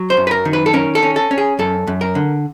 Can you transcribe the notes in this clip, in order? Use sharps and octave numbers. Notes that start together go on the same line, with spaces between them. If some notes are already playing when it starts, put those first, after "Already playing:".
Already playing: F#3
C5
F#2
B4
A#4
D#3
B4
A4
C#4 A#4
A4
C#4
A4
C#4
G#4
F#2 A4
F#2
A#4
D3